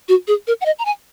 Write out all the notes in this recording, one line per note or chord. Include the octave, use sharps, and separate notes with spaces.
F#4
G#4
A#4
F#5
D#5
A#5
G#5